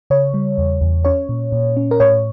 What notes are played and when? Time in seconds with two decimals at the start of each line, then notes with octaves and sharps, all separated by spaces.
0.10 C#3 C#5
0.34 G3
0.58 E2
0.81 E2
1.05 C#4 C#5
1.29 A#2
1.52 A#2
1.77 C#4
1.91 A#4
2.00 A2 C#5